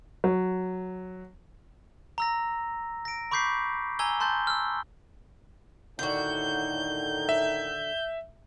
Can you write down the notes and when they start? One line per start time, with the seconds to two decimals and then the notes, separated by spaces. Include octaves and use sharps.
0.24 F#3
2.18 A#5 E6 A#6
3.05 A#6 D7
3.31 B5 C#6 D6 G6 B6 C7
3.99 G#5 A#5 E6 G#6 G7
4.20 A5 C6 F#6 G6 A6
4.47 E6 F6
5.99 A2 D3 D#3 D#4 F#4 G6
7.29 E5